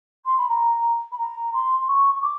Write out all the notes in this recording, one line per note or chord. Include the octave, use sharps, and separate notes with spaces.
C6
B5
A#5
B5
A#5
C6
C6
C#6
C#6
D6